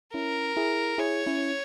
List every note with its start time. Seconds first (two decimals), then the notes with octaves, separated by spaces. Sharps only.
0.14 C#4 E4 A#4
0.57 E4 G#4
0.98 E4 G#4 C#5
1.26 C#4 E4